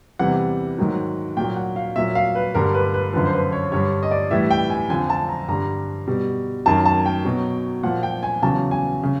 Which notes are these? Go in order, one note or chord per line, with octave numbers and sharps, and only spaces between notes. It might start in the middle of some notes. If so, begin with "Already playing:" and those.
E2 C3 E3 G3 F#5
G#2 D#3 F#3
A#2 F#3 G5
F#5
F5
A#2 F#3 E5
F5
B4
G2 D3 G3 A#4
B4
B4
F#2 D3 F3 B4
C5
B4
C#5
G2 D3 G3 C#5
D#5
D5
A2 E3 G3 E5
G5
G#5
F2 D3 F3 G#5
A5
A#5
G2 D3 G3 A#5
B2 G3
F#2 D#3 F#3 A5
A5
G5
B2 F#3
A#2 F3 F#5
G5
G#5
E2 C#3 F#3 A5
G#5
C#3